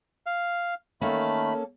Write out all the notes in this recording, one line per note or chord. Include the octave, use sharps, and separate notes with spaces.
F5
D#3 A3 A#3 C#4 A4 B5